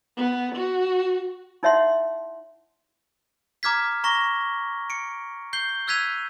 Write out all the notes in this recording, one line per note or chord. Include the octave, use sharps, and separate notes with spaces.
B3
F#4
D#4 E4 C#5 E5 F#5 C6
A#5 D6 F6 G#6 B6
A#5 C#6 A#6 G7
C#7 D7
G6 C7 G7
E6 F#6 G#6 B6 D#7 F7